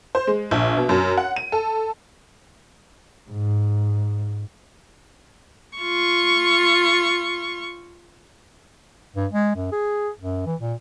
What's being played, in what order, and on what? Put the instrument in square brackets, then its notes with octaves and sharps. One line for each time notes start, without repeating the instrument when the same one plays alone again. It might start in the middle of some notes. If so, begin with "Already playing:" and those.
[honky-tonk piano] C5
G#3
A#1
B2
F#2
F#5
D#7
A4
[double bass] G#2
[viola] F4 C#6
[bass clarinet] G2
G#3
F#2
G#4
F#2
E3
A#2